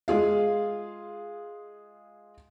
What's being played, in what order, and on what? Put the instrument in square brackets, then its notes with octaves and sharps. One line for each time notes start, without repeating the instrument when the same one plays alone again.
[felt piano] G#3 F4 G#4 F5